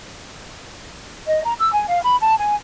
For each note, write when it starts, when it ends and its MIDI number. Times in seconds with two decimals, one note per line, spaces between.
1.27 1.43 75
1.44 1.53 82
1.59 1.73 88
1.73 1.85 80
1.88 2.01 77
2.03 2.15 83
2.20 2.37 81
2.38 2.55 80